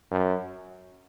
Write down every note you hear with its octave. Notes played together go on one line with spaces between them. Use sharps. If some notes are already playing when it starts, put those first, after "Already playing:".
F#2